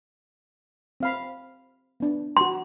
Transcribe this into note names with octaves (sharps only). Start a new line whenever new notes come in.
C4 F5 B5
B3 D4
F#4 F#5 C6